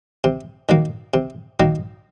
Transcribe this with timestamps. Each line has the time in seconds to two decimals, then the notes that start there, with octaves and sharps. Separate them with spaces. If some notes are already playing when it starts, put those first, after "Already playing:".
0.24 C3
0.69 D#3 F#3 A#3
1.14 C3
1.60 D#3 F#3 A#3